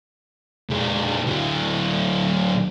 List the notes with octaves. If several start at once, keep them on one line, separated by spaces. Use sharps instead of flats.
F2 G#3
D2 F#3